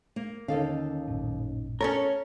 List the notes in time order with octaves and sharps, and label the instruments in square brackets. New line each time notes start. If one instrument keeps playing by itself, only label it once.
[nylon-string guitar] A#3
[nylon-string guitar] D#2 A4 F5 [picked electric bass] D3 [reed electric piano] C#4 D#4 D#5
[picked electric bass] A1 F#2 A#2
[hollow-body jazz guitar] C#4 A4 A#4 [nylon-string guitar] C#5